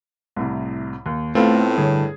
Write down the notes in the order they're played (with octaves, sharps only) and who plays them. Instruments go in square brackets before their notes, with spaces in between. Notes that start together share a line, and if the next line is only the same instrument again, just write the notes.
[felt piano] C2 A2 C3
D#2
[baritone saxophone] A2 [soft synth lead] A3 [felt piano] B3 F5 [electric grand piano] C4 F4 A4
[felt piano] G2 C#5 [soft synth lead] D3 [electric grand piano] G#4